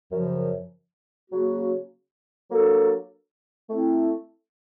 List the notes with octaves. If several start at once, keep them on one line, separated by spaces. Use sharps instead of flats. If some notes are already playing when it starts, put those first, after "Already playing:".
F#2 C#3 F3
C#3 F#3 A#3 C#4 F#4
F#3 A#3 D4 F#4 A4
A3 C4 E4